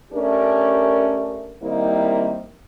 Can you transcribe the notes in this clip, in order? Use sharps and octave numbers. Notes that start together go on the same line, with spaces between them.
A3 C#4 D4 G4 A#4
D#3 G3 A#3 C4 D#4 E4